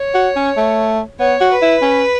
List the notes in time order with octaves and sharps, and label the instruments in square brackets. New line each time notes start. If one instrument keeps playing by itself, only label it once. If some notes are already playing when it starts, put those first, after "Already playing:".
Already playing: [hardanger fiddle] C#5
[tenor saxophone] F#4
C#4
A3
[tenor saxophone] B3 [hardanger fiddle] C#5
[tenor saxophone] F#4
[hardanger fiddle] B4
[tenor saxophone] E4
C#4